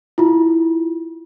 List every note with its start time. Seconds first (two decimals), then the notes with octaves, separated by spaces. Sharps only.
0.18 E4 F4